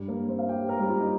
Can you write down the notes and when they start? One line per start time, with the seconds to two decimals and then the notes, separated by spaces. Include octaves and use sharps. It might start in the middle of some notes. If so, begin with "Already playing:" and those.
Already playing: G2 G3
0.08 A#3 A#4
0.28 C4 C5
0.39 F5
0.49 G4 G5
0.69 A#4 A#5
0.79 G3 G4
0.90 F4
1.00 D#4